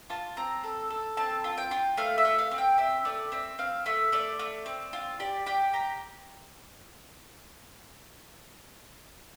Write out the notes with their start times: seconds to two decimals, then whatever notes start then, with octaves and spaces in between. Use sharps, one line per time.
0.10 F4 A5
0.37 C4 A#5
0.64 A4
0.90 A4
1.17 C4 A5
1.44 F4
1.58 G5
1.71 F4
1.97 A3 F5
2.18 E5
2.25 A3
2.39 F5
2.51 C4
2.58 G5
2.78 G4 E5
3.05 A3 D5
3.32 C4 E5
3.59 C4 F5
3.86 A3 E5
4.12 A3 D5
4.39 A3
4.66 C4
4.93 F4
5.20 G4 D5
5.46 G4 G5
5.73 G4 A#5